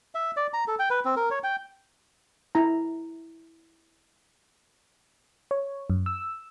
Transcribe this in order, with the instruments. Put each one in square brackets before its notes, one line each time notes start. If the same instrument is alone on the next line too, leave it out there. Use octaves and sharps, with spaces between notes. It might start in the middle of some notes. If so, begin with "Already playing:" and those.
[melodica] E5
D5
A#5
A4
G5
B4
C4
A#4
C#5
G5
[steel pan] E4 A#5
[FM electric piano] C#5
F#2
E6